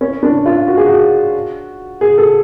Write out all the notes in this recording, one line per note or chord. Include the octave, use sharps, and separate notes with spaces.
C#4
D4
F4
F#4
G#4
F#4
G#4
A4